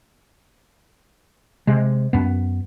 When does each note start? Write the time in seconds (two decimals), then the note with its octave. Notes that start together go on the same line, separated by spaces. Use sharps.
1.67 C3 G#3
2.13 F#2 B3